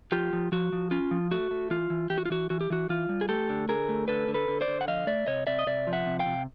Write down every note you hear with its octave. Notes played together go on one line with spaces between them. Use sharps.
F3 F4 G4
F3
F3 F#4
F3
C#4 F4
F3
A3 F#4
A3
E3 F4
E3
E3 G4
F#4
F4
E3 F#4
E3 F#4
G4
E3 F#4
E3 F4
G3
G#4
A3 G4 A4
D3
D3 G#4 A#4
A3
D3 A4 B4
D3
A4 B4
D3
C5 D5
D3
F#5
F3 D#5 F5
A3 D5 E5
C3 C#5 D#5
C3 D5 E5
D#5
C3 D5 E5
F3
E5 F#5
C3
F5 G5
C3